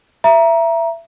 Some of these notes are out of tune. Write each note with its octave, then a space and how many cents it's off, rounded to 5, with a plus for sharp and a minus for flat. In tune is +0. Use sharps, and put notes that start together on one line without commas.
E5 +20 A#5 +15